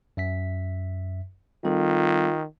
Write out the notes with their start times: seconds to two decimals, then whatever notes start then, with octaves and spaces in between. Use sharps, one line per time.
0.17 F#2 E5 B6
1.65 D#3 G3 C4 F4 A4